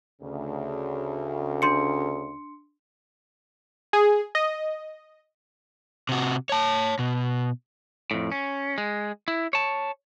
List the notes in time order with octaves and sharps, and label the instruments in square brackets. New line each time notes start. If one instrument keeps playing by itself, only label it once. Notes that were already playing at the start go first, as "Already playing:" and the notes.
[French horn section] D2 C#3
[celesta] D4 C6 C#7
[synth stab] G#4
D#5
[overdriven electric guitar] C3 F#4
C#5 A5
B2
[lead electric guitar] F2 A2
C#4
G#3
E4
C#5 A5